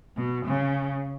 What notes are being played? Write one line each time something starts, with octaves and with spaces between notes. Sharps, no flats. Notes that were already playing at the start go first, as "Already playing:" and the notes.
B2
C#3